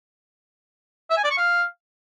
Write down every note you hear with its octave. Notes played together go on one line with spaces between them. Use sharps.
E5
G#5
D5
C#6
F5